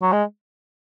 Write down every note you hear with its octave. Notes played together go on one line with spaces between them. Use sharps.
F#3
G#3